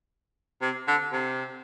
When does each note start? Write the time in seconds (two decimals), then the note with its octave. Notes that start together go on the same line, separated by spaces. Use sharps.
0.62 C3
0.88 D3
1.13 C3